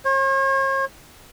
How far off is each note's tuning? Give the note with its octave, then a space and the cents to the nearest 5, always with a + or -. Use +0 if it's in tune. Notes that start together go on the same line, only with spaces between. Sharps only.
C#5 -45